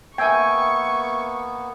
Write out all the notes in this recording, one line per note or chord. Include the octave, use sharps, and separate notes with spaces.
A#3 B3 E5 G5 G#5 C#6 E6 G#6